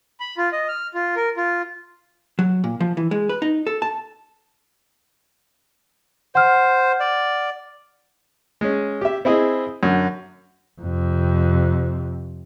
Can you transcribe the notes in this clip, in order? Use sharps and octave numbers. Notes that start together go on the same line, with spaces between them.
B5
F4
D#5
F6
F4
A#4
F4
F#3
A#2
F3
E3
G#3
B4
D#4
A4
A5
C5 F#5 F6
D5
G#3 C#4
G4 E5
C4 E4 G#4 D#5
F#2 D3
F2 C3